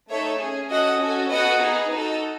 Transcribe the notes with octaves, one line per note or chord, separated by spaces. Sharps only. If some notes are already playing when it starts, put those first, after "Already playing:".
A3 D#4 A4 C#5 E5
C#4 G#4
C#4 F#4 A4 D#5 F#5
C#4 F#4 A4
B3 F#4 A4 D#5 F#5
B3 D#4 G#4
D#4 F#4 A4